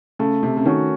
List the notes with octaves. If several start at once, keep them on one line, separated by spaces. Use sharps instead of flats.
C#3 A3
C3
C#3
D#3 C#4 F#4